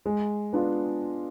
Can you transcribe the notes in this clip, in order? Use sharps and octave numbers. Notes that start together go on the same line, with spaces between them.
G#3
B3 D4 F4